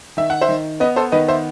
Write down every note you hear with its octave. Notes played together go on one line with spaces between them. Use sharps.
D#3 E5
F#5
C5 E5
D#3
B3 B4 D#5
A4 C5
D#3 B4 D#5
C5 E5